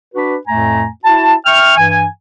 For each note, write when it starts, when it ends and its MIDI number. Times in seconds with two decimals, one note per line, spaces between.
0.14 0.36 62
0.14 0.36 66
0.14 0.36 71
0.47 0.86 41
0.47 0.86 45
0.47 0.86 57
0.47 0.86 80
0.47 0.86 82
1.04 1.34 64
1.04 1.34 66
1.04 1.34 81
1.45 1.75 76
1.45 1.75 79
1.45 1.75 85
1.45 1.75 89
1.77 2.06 43
1.77 2.06 52
1.77 2.06 80